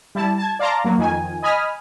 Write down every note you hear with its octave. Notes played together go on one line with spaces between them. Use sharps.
G3 E4 A5
A5 G#6
D5 F5 A5 A#5 C6 D6
F#3 A#3
F2 D#3 G#5
D#5 G#5 B5 D#6 F6